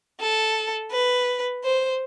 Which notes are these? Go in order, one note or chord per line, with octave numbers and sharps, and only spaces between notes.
A4
B4
C5